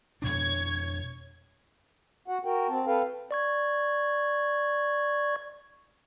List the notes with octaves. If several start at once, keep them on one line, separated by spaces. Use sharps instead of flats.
F2 B2 D4 C#5 G#6
F#4 F#5
F#4 A#4 G5
C4 A5
A4 B4 F5 G5
D5 C#6 G#6